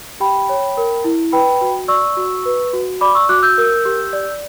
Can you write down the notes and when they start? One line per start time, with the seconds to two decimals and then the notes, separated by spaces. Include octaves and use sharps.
0.20 G4 G5 B5
0.49 C#5
0.77 A#4
1.04 E4
1.32 B4 G5 B5
1.61 F#4
1.88 D5 C#6 E6
2.17 F#4
2.45 B4
2.73 F#4
3.01 D5 B5 D6
3.15 C#6 E6
3.29 F#4 D6 F#6
3.42 E6 G6
3.58 A#4
3.85 G4
4.13 D5